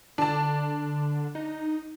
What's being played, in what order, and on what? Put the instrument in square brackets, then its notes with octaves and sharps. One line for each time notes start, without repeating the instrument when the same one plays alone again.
[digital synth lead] D3 [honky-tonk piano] D4 A5
[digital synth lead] D#4